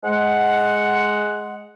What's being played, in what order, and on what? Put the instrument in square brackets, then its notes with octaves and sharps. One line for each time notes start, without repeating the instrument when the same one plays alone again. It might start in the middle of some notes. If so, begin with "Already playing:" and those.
[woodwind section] G#3 F#5